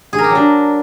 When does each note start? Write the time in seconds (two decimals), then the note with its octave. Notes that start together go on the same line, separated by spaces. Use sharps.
0.13 G#4
0.18 A#4
0.24 G4
0.30 F#3
0.35 D4